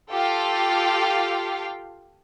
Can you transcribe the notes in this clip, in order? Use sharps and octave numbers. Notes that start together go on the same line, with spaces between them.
F4 G4 A4 F5 G5